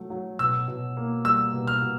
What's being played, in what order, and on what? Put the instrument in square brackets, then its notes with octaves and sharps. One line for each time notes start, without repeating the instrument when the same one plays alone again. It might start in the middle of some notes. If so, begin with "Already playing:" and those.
Already playing: [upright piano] F#3 A3
F#3
[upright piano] B2 [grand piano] E6
[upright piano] B2
A#3
[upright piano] G3 [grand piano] E6
[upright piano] B2
[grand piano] F6
[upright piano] B2